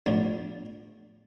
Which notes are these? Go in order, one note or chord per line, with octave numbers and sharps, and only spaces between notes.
B1 A2 F3 D4